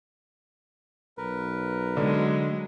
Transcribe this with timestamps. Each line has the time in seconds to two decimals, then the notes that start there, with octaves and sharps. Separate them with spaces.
1.18 B1 A#4 B4
1.97 D3 F#3 G#3